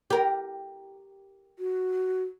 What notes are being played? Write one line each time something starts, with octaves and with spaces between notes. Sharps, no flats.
G4 A#4
F#4